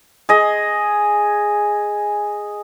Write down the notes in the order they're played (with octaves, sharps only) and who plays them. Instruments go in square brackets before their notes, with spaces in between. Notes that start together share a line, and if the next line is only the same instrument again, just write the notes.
[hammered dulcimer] G#4 D#5